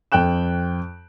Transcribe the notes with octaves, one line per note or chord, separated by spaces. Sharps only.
F2 A4 G5 F#6 E7